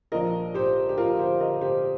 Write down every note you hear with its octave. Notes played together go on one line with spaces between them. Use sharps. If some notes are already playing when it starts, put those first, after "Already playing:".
A#1 A#2 F3 A#4 D#5
G4 C5
G4
F4 A#4
G4 C5
A#4 D#5
G4 C5